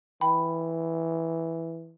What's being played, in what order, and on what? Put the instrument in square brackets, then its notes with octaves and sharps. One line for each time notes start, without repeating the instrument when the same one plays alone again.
[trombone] E3 [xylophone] G5 B5